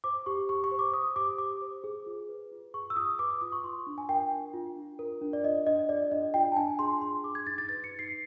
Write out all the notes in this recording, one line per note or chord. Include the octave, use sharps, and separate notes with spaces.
C5 D6
G4 C#6
G4 C#6
C#6
C5
D6
C5 D#6
G4 D6
G4 D6
C5
G#4
F4
B4
F4
G#4 C#6
E6
F4 D#6
B4 D6
D6
F4 D#6
C#6
F4 C6
D4
G#5
A#4 G5
D4
F4
D4
A#4
D4
D5
F4 D#5
D4 D#5
G#4 D5
D4 D#5
F4 G5
A5
D4 G#5
G#4 C6
D4 C6
G#4 D6
G#6
D#4 A6
A6
B4 A6
C#7
D#4
C7